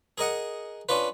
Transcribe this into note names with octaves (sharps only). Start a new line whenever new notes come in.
G#4 A#4 D#5 F#5
C#4 D4 F4 B4